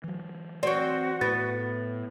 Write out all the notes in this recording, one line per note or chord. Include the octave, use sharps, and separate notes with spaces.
E3 F#3
C4 F#4 C#5 D5
A2 B3 A6